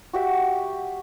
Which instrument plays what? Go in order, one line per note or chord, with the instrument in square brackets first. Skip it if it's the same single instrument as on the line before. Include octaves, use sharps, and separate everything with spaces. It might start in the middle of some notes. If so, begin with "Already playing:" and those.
[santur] F#4 G4 E5